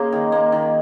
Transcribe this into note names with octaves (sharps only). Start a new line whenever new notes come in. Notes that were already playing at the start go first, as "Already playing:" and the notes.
Already playing: C#3 A#3 F4 G#4 A#4
D#3
A#3
D#3